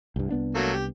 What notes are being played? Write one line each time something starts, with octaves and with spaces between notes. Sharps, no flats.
C2 G2
C2 B3 D4
F#3 A3 A#3
G4